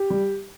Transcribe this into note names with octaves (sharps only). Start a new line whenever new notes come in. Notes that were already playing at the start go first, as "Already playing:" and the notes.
Already playing: G4
G3